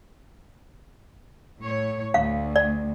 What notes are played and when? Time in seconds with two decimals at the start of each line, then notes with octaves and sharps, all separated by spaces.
1.60 A2 C#5
2.14 D2 F5
2.56 D5